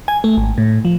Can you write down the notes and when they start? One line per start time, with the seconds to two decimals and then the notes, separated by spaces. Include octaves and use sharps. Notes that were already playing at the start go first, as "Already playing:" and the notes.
0.08 G#5
0.24 A3
0.37 G#1
0.58 A2
0.85 F3